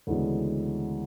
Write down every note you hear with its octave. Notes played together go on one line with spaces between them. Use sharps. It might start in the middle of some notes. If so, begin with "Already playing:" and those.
D2 C#3 E3 G#3 B3